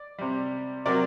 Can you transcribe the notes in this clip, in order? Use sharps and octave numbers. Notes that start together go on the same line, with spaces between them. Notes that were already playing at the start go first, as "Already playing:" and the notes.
Already playing: D5
C3 G3
C3 F#3 A#4 D5